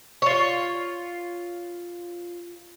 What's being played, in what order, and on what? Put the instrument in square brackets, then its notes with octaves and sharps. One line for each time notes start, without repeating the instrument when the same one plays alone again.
[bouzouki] F4 C#5